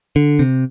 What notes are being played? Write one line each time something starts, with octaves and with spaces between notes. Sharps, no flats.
D3
C3